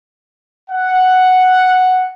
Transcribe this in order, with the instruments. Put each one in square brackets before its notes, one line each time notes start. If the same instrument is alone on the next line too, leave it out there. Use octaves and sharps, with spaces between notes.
[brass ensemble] F#5